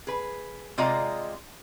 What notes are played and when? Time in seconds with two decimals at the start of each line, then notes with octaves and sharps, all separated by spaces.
0.07 G#4 B4
0.78 C3 G#3 F4 D5 D#5 A#5